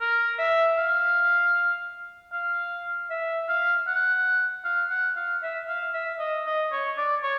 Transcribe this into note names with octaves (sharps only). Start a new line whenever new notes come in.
A#4
E5
F5
F5
E5
F5
F#5
F5
F#5
F5
E5
F5
E5
D#5
D#5
C#5
D5
C#5